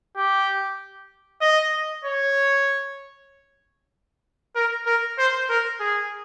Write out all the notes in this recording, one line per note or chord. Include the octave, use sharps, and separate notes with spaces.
G4
D#5
C#5
A#4
A#4
C5
A#4
G#4